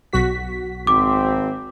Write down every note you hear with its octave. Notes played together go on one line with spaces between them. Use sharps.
B1 F#4 B6
G#1 C4 D6